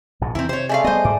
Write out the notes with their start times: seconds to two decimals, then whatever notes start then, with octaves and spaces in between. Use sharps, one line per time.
0.21 A#1 G#2 B2
0.35 E2 C3 D#3 C4 E4
0.49 C3 C5 C#5
0.69 G#3 A3 D5 E5 F5
0.84 G3 B3 C5 D#5
1.05 G#2 D5